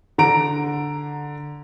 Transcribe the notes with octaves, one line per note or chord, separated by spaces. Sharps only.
D3 A#5 D7